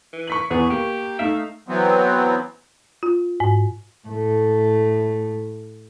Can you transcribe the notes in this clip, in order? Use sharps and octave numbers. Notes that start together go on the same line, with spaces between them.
E3
C#6 B6 F#7
E2 B3 G#4
A#3 G4
A3 D#4 E5 F5
E3 F#3 B3 C4
F4
G#2
A2 A3